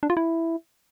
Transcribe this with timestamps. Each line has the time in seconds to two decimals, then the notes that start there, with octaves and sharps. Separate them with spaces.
0.03 D4
0.10 F4
0.17 E4